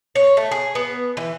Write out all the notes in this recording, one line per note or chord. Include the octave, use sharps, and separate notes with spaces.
C#5
A3
G#4
B3
E3